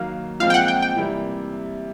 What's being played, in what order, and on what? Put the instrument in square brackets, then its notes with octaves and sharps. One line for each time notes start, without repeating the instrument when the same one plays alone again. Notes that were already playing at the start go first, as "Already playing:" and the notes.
Already playing: [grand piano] D#3 F#3 A#3 [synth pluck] F5
[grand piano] A#2 F3 G#3 C4 [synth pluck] F5
[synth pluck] G5
F#5
G5
G5
[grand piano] C3 E3 G3 A#3